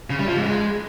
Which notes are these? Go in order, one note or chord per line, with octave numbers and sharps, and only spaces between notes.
C#3
G3
F3
G#2
G#3